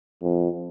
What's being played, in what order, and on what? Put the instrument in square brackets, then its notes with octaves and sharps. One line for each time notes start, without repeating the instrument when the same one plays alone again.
[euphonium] F2